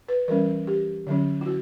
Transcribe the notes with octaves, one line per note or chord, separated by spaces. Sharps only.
B4
E3 G3 C#4 A#4
G4
D3 F#3 C#4
E4
F#4